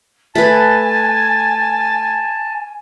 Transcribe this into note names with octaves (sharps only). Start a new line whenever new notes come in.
A3 B4 G#5 A5 A6